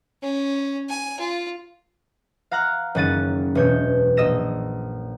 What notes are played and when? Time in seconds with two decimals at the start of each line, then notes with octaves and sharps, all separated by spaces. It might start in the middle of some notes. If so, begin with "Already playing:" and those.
0.23 C#4
0.89 G#5
1.20 F4
2.51 F5 F#5 A#5 F6 F#6
2.95 F#1 D#3 C#4 F#5 A6 D#7
3.55 E1 B2 C#5 G6
4.17 A#1 D#5 E6 A#6 E7